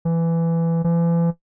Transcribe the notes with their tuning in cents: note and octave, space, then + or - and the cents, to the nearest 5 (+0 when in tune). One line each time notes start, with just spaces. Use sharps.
E3 +15
E3 +40